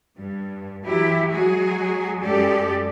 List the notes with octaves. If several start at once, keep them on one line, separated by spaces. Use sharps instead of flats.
G2
E3 F#3 E4 G4
F#3 G#3 F#4 G#4
F#2 G#3 G4 A4 D5